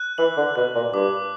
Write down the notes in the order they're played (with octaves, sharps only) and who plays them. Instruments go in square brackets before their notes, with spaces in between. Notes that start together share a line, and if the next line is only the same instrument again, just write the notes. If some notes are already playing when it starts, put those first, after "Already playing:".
Already playing: [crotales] F#6
[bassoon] E3 [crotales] F#7
[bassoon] D3
[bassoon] B2 [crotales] F#6
[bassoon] A#2
[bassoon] G2 [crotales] D6